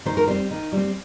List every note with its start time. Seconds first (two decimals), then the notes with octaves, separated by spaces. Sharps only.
0.06 D#3 C5
0.17 A#4
0.27 G3 C4 C5
0.51 D#3
0.72 G3 C4